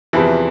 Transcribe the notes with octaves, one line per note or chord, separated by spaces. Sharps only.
E2 C3 E3 F3 E4